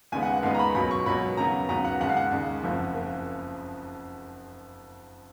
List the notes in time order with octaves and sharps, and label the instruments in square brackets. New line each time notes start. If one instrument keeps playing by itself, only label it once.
[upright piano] D#2 C#3 G#3 B3 G#5
F#5
F#5
D#2 C#3 G#3 B3 F5
A#5
B5
C#2 B2 F#3 A#3 B5
C#6
C#2 B2 F#3 A#3 B5
D#2 C#3 F#3 B3 A#5
D#2 C#3 F#3 B3 A#5
F#5
D#2 C#3 G#3 F#5
F5
F#5
D#2 C#3 G#3
F#1 F2 C#3 F3 A#3
C#3 A#3